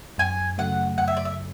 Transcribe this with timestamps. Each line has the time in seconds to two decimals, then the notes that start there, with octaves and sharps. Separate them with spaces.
0.18 F#2 G#5
0.58 C#3 F#3 A3 F#5
0.98 F#2 F#5
1.08 E5
1.17 D5
1.25 E5